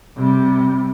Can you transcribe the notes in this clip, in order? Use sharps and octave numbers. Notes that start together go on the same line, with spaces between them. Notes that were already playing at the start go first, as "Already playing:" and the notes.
C3 G3